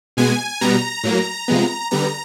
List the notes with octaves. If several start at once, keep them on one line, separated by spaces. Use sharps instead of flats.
B2 G#3 B3 G#5
B2 G3 B3 A#5
A2 F#3 A#3
C3 F3 G#3 B3
D3 G3 B3 A#5